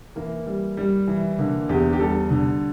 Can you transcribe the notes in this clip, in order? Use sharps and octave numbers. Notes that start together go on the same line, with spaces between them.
E3 A#3
G3
G3
E3
D3 A#3
E2 G4
G4
G3 A4
D3